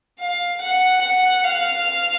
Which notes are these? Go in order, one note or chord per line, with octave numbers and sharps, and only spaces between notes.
F5
F#5
F#5
F5